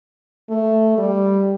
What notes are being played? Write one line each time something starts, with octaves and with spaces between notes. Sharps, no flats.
A3
G3